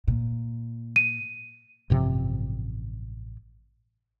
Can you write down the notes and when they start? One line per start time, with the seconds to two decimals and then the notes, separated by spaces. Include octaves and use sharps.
0.07 A#2
0.96 D#7
1.90 A1 G2 C3 F3